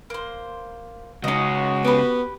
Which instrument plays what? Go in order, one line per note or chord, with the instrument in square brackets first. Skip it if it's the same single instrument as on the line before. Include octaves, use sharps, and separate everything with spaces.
[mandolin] A#3 C5
[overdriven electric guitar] C#2 C#4 [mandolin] D#4 D#5 [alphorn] F#4
[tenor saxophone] B3 [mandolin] G4 B4